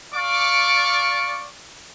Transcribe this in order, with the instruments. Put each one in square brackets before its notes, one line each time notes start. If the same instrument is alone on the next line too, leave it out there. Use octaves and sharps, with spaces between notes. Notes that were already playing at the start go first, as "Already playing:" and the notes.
[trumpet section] D5 F5 C#6 D6